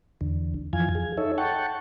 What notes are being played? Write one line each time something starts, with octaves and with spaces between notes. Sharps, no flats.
E2 D3
F2 E3 F3 F5 G#5 G#6
G#4
D#4 A4 C#5 E5
F#5 G5 A5 C#6